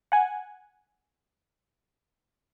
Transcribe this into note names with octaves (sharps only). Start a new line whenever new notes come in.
F#5 G#5